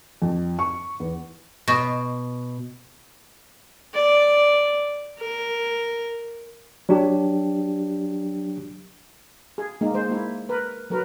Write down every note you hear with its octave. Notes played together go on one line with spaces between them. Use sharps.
F2
C#6
E2
B2
D5
A#4
F#3 D4 G4
G#4
G#3 A#3 D#4
G#3 C5
A#3 E4
A#4 B4
F#3 A#4 B4